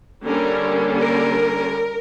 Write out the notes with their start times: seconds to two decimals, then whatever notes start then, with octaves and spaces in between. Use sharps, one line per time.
0.24 D3 G3 A#3 C#4 A#4
0.98 A#4